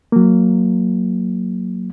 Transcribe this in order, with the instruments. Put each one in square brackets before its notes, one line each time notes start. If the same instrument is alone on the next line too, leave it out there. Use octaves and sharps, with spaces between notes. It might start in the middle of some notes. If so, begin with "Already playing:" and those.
[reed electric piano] F#3 A#3